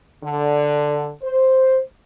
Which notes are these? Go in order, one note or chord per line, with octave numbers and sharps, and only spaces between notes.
D3
C5